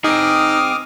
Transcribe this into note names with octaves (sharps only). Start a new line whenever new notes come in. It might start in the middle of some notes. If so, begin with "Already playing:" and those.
C4 D#4 G#4 D6 D#6 F6